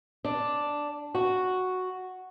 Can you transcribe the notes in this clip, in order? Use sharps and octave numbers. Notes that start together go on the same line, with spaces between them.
D4
F#4